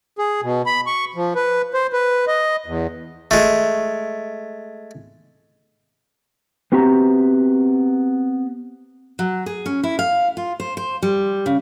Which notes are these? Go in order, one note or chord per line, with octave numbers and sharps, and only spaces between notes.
G#4
B2
B5
C#6
F3
B4
C5
B4
D#5
E2
G#3 A3
B3 C4 F#4 G4 E5 A#5
F#3
G#4
C#4
E4
F5
F4
C5
C5
G3
C#3